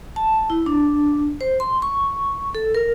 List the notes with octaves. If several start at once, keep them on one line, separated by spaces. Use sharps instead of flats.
A5
E4
D4
C5
C6
C#6
A4
A#4